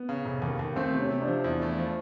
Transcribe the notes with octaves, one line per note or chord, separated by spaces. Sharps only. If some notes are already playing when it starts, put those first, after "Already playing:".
Already playing: B3
C#3
F1
D#2
D#2
A3 C4
C3
C#4
C3
D4
F3
E2
A3
F3